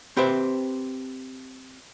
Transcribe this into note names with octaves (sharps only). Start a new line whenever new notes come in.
C4 G4 B4 C5 E5